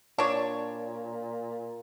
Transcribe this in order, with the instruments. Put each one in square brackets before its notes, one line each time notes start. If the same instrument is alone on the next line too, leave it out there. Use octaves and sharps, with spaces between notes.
[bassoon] A#2 [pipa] D4 C#5